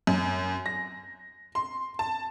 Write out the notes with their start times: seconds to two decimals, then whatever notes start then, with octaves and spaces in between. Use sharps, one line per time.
0.07 F#2
0.66 A#6
1.55 C6
1.99 A5